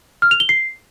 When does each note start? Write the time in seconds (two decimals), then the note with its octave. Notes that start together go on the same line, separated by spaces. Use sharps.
0.22 F6
0.31 F7
0.40 G7
0.49 C7